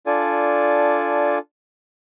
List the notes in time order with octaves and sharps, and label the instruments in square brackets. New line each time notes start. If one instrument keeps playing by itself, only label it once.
[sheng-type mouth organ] D4 F4 A4 D5 G#5